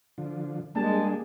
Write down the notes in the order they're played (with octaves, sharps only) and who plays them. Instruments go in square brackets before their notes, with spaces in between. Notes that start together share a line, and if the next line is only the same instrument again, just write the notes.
[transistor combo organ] D3 F3
[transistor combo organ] G3 D4 G#4 [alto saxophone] G#3 [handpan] A#3 [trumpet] A5